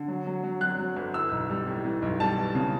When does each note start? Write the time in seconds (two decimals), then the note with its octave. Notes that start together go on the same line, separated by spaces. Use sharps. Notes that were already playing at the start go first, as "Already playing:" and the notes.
Already playing: D3
0.08 F#3
0.27 F#3
0.44 F#3
0.61 F#3 F#6
0.79 F#3
0.96 G1
1.14 E3 E6
1.32 B1
1.49 G3
1.67 A2
1.85 E3
2.02 B1
2.20 G3 A5
2.37 E3
2.55 C#3